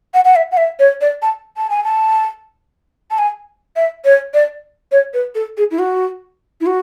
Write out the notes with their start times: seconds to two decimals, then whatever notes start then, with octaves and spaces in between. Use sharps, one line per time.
0.14 F#5
0.25 F#5
0.36 E5
0.52 F#5
0.57 E5
0.79 C#5
1.01 D5
1.22 A5
1.57 A5
1.70 G#5
1.84 A5
3.11 A5
3.18 G#5
3.76 E5
4.05 C#5
4.34 D5
4.92 C#5
5.14 B4
5.35 A4
5.57 G#4
5.71 E4
5.79 F#4
6.61 E4
6.66 F#4